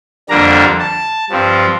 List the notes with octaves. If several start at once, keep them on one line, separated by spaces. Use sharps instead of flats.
F2 D3 G3 A#3 D4 A#5
A5
G2 F3 C4